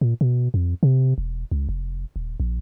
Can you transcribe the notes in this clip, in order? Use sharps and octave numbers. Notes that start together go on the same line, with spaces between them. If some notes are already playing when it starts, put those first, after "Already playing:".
A#2
B2
F2
C3
E1
C#2
F1
D#1
A#1